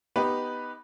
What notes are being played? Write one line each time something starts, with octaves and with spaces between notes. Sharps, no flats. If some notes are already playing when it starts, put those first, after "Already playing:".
B3 D#4 G4 B4